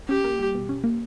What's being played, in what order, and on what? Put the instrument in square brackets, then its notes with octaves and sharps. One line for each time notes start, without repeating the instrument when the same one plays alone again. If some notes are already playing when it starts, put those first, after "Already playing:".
[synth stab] C#4 [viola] G4
[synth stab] A#3
G3
B2
C#4
A#3